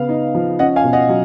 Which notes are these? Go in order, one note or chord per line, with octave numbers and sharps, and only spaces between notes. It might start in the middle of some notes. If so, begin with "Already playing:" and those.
Already playing: C#3 B3 F5
D#4
F3
C#4 D#5 F#5
F5 G#5
B2
D#5 F#5
F#3